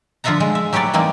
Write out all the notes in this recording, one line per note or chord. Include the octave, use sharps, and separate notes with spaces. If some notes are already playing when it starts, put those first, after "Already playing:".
D3 F3 F4 E5 F#5 A#5
G#3
E5
F#3 G4 B4 C#5 D5
E3 G3 A#3 C4 D#4